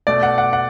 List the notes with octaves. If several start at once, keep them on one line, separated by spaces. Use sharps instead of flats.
B2 A3 D5
F#5
F#5
F#5